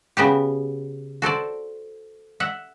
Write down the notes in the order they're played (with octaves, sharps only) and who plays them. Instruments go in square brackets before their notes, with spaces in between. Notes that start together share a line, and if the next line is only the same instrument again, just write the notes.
[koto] C#3 B3 F#4 G4
F#4 A4 C5 D5
E5 F#5